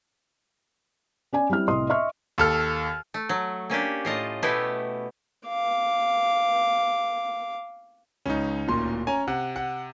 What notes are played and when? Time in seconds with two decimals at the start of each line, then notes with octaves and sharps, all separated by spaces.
1.33 C#4 D5 G#5
1.50 G3 C4 E4 F6
1.68 C2 A2 D#5 C6 D#6
1.90 D#5 E5 C6 C#6 F6
2.38 D#2 A4 F6
3.14 A3
3.29 F#3
3.70 A#3 C#4 D4 G4
4.05 A2 F4 D#5 A5
4.42 B2 A3 B3 E4 G4
5.47 F5 D6
8.26 C#2 C#4 D#4
8.68 D1 A#2 C6
9.07 C#4 G#5 A#5
9.28 C3 F#5
9.56 F#5